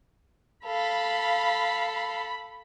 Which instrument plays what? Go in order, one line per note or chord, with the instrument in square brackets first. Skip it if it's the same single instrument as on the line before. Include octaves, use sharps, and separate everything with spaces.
[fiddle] A4 F5 [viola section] B5